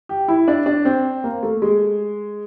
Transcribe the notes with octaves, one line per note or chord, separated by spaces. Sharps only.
G4
E4
D4
D4
C4
A#3
A3
G#3